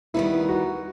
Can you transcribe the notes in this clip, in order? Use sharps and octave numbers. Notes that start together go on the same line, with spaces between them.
D#3 G3 B3 D#4 E4
F#4